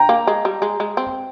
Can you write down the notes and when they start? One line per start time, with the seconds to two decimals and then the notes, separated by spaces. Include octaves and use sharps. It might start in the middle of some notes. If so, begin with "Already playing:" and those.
Already playing: G5 A#5
0.09 A#3
0.27 G#3
0.45 G3
0.62 G#3
0.80 G#3
0.97 C4